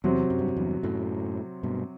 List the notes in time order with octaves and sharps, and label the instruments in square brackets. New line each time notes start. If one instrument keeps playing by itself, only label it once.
[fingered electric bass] E2 [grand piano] C3 F#3 C4
[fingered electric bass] F#2
G2
F#2
E2 G2
F#2 A2
G2 B2